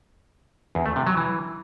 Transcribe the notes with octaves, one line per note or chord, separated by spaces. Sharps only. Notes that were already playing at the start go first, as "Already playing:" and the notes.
E2
A3
C3
F#3
E3